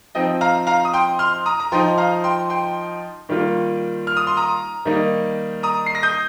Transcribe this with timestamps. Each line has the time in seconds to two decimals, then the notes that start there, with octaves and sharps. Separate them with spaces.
0.15 F3 C4 D#4 D#5 G5
0.41 F5 A#5
0.67 F5 A#5
0.85 D#6
0.94 G5 C6
1.19 C6 F6
1.46 A#5 D#6
1.60 A#5
1.72 F3 D#4 G5 C6
1.98 F5 A#5
2.24 G5 C6
2.50 G5 C6
3.29 D#3 G3 A#3 F4
4.07 F6
4.17 D#6
4.27 C6
4.37 A#5 D#6
4.85 D#3 G3 A#3 D#4
5.63 A#5 D#6
5.86 C7
5.95 A#6
6.03 D#6 G6